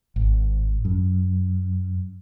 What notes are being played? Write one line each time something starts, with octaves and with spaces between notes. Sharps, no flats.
G#1
F#2